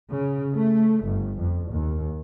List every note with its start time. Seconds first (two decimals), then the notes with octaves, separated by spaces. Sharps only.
0.12 C#3
0.55 A3
1.06 G1
1.40 F2
1.71 D#2